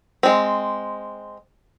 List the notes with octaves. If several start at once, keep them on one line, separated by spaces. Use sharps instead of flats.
G#3 C4